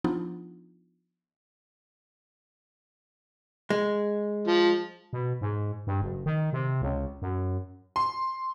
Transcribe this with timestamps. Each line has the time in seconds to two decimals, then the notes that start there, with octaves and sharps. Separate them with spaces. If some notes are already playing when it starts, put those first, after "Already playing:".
0.04 F3 B3 D4 D#4 F4
3.70 G#3
4.47 F3
5.13 B2
5.41 G#2
5.87 G2
6.02 F#1
6.26 D#3
6.53 C3
6.82 C#2
7.22 F#2
7.96 C6